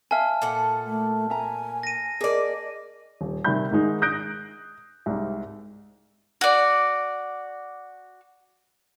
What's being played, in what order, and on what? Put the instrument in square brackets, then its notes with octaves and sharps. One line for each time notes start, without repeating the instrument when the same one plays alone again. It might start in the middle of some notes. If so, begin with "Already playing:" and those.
[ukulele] E5 F5 G#5 [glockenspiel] A5 F6
[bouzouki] A#2 A4 F#5
[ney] A3
[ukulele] E5 A#5 [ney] G#5
[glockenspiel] A#6 D#7
[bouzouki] A#3 D5 [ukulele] G#4 A#4 [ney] D#5
[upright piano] D#1
C3 D#3 G3 E5 B5 G6
G#2 D#3 G#3 D#4
D#6 F#6 G6 A#6 D7
C2 G#2
[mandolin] F#4 D5